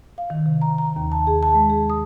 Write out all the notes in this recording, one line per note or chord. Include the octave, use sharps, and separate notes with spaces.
F5
D#3
C3
A#5
A#5
D#2
A5
G#4
A5
G#3
G#4
D#6